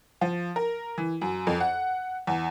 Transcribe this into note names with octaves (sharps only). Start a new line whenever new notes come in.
F3
A#4
E3
F#2
F2
F#5
E2